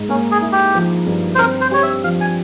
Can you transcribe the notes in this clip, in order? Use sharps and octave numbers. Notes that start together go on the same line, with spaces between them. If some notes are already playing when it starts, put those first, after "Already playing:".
Already playing: G#2
A#3 C#4
G#4
E4
G4
F3
G2
C5
C4 A#4
C5
G4 C#5
E5
F3 F5
G#5